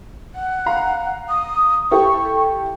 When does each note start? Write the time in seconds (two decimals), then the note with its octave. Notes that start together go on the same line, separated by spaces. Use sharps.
0.35 F#5
0.66 F5 A#5
1.29 D#6
1.91 E4 G4 A4 C#6